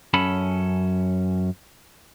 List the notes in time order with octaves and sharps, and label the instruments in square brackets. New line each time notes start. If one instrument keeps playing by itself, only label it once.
[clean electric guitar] F#2 C#4 A4 B5